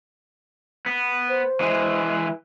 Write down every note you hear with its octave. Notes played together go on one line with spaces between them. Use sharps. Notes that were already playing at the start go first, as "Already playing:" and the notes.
B3
C5
E3 G#3